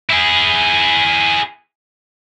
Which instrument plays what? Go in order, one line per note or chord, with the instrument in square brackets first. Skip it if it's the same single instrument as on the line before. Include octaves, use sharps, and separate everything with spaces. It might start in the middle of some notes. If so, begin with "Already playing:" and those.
[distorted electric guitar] E4 G#4